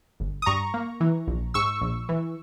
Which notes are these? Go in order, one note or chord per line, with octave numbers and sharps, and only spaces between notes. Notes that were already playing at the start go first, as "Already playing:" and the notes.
G1
D#6
G2 A#5 C#6
A#3
E3
A#1
G#2 C#6 E6
A#1
E3